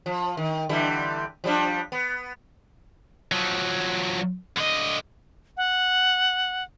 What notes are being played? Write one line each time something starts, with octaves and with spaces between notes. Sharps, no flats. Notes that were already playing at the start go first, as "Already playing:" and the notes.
F3
D#3
D3 E3 G3
F3 G3 D4
B3
F3 F#3
D3 D#5
F#5